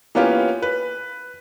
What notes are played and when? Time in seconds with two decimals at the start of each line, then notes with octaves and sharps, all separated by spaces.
0.15 E3 A#3 B3 C#4 F4 G4
0.62 B4